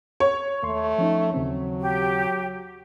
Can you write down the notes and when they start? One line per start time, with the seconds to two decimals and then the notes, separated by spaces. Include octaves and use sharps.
0.20 C#5
0.63 D#2 A3 C6
0.98 F3 C#4 D#4
1.34 D#2 C#3 F#3 C4
1.81 G4